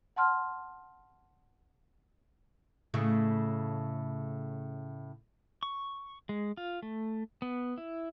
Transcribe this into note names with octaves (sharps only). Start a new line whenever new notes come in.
F#5 A5 C6 F6
A2 C#3 A3
C#6
G#3
F4
A3
B3
E4